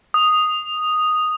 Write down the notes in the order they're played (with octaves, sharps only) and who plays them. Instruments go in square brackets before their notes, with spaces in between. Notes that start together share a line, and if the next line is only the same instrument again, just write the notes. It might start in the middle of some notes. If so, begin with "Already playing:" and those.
[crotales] D#6